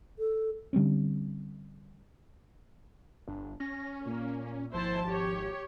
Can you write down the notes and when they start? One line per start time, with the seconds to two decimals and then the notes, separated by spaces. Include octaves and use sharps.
0.19 A4
0.73 D3 G3 C4 C#4
3.28 G1 D4
3.60 C#4 A#6
4.05 A#2 A#3
4.74 G#1 F3 E4 C5 A5
5.09 G4 C#5